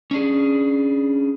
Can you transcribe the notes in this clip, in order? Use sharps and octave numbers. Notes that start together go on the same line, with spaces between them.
C#4 D4 G#4